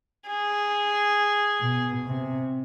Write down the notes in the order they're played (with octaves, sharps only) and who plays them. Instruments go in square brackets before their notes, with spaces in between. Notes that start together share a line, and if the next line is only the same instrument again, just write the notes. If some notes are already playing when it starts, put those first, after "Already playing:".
[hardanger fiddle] G#4
[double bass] B2
C3